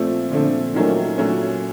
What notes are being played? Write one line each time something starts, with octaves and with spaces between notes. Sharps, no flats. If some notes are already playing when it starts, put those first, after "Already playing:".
Already playing: A#2 F3 A3 C4
A#2 D3 F3 A3 C4
A#2 D#3 F#3 A3 C#4
A#2 F#3 A3 C#4